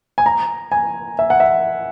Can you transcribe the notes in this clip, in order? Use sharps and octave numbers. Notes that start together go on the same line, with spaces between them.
G#5
A#5
G#5
E5
F#5
E5